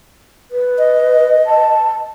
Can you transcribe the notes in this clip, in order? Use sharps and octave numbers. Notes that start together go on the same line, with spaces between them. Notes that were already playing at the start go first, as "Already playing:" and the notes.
B4
D#5
A5